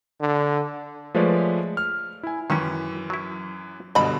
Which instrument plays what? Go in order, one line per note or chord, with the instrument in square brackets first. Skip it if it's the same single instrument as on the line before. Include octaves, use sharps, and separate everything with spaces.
[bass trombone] D3
[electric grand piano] F3 G#3 A3 B4 C#5 D5
F6
E4 G#5
[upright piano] F#2 E3 [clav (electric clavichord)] D#3 C#4
[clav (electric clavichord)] F#3 E4
[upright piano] G2 B2 D3 [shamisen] D#5 B5